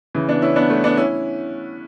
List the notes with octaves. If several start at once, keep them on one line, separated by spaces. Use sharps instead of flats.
C#3 E3
B3 D4
C#4 E4
B3 D4
A3 C#4
B3 D4
C#4 E4